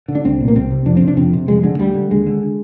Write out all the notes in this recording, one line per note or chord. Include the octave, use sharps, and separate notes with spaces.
D3
D4
C2 C4
A#2
A#3
C2 C4
C3
F2 D4
C4
C3
D4
F2 C4
C3
F2 G#3
D3 G#3
D2 G3
D3
D#2 G#3
D3